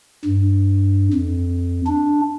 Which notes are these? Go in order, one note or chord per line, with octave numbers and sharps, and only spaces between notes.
G2
F2
D4